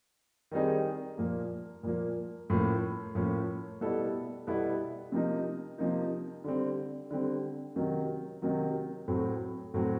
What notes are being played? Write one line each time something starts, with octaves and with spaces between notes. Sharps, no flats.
D#3 G3 C4 D#4 G#4
A#2 F3 A#3
A#2 F3 A#3
A2 F3 A#3 C#4
A2 F3 A#3 C#4
B2 G3 B3 E4 A4
B2 G3 B3 E4 A4
C3 F3 A#3 D#4
C3 F3 A#3 D#4
D3 G3 C4
D3 G3 C4
C3 D#3 F#3
C3 D#3 F#3
A2 F#3 A3 C4
A2 F#3 A3 C4